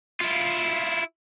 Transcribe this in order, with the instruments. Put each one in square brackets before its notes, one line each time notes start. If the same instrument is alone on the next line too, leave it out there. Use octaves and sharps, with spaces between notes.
[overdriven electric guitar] E4 F4